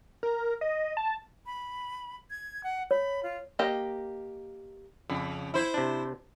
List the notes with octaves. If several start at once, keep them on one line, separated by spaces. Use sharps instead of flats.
A#4
D#5
A5
B5
G#6
F#5
C#5 B5
F4
A#3 G4 D#5
F2 C#3
E4 C5
C3 D4